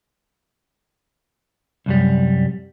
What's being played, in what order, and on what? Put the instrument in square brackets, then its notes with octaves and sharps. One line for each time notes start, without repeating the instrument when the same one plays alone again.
[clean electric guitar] C2 F#2 G3